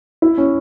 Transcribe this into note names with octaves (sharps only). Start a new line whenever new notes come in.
E4
C#4